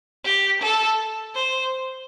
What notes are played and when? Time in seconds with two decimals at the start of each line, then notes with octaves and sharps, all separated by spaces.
0.25 G4
0.61 A4
1.35 C5